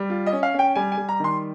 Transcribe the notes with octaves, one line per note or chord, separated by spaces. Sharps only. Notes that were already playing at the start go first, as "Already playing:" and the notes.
Already playing: G3
F4
D#5
C#4
F5
C#4 G5
G3 G#5
G#5
G3
A#5
D#3 C6